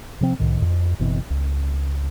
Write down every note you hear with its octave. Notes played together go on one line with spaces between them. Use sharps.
C3 F3 C4
C2 A2 D#3
F2
F#1 B2 E3 C4
C#2